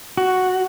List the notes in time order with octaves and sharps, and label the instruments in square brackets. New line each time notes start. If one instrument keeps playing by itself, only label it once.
[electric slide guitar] F#4